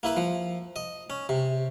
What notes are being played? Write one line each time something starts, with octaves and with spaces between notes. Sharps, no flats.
A#3 E4 B4
F3
D#5
C#4
C3